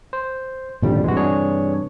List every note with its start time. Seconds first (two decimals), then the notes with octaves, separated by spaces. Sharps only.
0.13 C5
0.82 G#1 D#2 A#2 D3 F3 G3
1.04 G2 C3 E3 G#3 F#4
1.17 D4 G#4 C#5